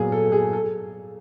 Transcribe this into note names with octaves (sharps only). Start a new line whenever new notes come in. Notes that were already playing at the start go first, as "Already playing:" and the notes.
Already playing: A#2 F#3 B3 G#4
A4
G#4
A4